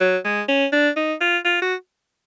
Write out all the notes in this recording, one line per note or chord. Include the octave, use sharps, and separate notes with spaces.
F#3
G#3
C#4
D4
D#4
F4
F4
F#4